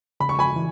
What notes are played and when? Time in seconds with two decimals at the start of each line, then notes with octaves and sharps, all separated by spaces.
0.20 C#3 B5
0.29 C#6
0.39 G#5 B5
0.56 E3